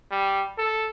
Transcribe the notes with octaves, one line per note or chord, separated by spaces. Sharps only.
G3
A4